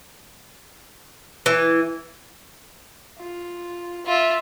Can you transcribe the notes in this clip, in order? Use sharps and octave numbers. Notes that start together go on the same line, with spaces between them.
E3
F4
F4 E5